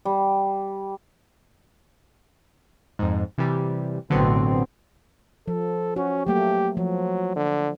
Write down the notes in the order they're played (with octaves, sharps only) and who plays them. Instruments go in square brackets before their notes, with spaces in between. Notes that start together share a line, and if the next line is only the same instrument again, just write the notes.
[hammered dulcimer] G3
[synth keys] F2 G#2
C3 E3 G3
[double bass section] A1 B2 C4 [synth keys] D3 F#3 B3
[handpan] F3 [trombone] A4
[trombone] C#4 [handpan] F#4
[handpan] F#3 A3 A#3 [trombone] G4
[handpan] F3 [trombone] F#3
[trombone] D3